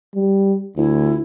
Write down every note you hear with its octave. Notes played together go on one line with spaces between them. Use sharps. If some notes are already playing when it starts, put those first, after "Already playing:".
G3
D2 E4